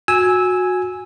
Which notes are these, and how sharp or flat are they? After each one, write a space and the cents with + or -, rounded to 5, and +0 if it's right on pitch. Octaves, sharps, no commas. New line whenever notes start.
F#4 -20 G#5 +0 E6 -15